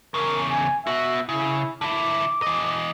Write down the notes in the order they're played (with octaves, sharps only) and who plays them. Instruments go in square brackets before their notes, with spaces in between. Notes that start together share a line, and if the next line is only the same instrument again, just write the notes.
[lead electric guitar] E2 C#3 [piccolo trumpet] A#4
[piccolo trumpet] G#5
[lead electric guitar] B3 F#4 [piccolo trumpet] E5
[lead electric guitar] C#3 [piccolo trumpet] E4
[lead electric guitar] D3 E4 [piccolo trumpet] D6
[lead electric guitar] E3 D#5